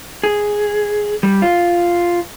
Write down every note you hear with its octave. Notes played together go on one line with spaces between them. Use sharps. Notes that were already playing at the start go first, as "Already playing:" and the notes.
G#4
G3
F4